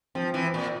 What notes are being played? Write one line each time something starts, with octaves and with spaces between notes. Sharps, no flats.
F3 C4
E3
C4
A#2